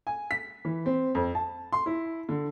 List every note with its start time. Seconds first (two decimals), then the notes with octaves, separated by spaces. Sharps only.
0.07 G#5
0.31 B6
0.65 E3
0.86 C4
1.15 F2
1.35 A5
1.73 C6
1.86 E4
2.29 D3